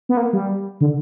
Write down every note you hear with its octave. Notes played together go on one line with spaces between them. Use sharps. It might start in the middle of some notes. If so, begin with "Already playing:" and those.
B3
A#3
G3
D3